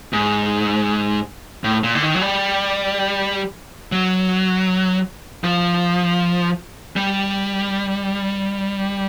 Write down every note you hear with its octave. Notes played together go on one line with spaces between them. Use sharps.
G#2
A2
A#2
D3
D#3
F#3
G3
F#3
F3
G3